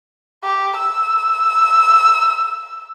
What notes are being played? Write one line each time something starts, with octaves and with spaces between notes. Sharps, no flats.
G4
E6